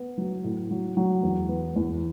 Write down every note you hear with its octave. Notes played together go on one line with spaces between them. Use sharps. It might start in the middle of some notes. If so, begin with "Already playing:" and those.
Already playing: B3
F#3
A2
F#3
F#3
E2
B3
E2